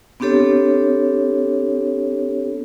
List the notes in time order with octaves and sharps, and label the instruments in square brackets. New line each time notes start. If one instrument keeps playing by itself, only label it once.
[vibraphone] B3 C4 D4 G4 A4 C#5